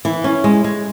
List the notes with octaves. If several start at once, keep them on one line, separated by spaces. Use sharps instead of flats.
E3
C#4
G#3
G#3